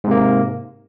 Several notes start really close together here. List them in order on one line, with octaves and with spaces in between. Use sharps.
G#2 C3 A#3